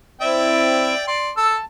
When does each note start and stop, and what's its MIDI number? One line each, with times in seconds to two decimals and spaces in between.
0.21 0.94 60
0.21 0.94 64
0.21 1.06 74
0.21 1.06 76
0.21 1.06 79
1.07 1.30 74
1.07 1.30 84
1.37 1.57 69
1.37 1.65 81
1.37 1.57 88